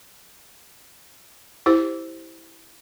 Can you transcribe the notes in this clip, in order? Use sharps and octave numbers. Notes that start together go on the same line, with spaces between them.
E4 G4 C5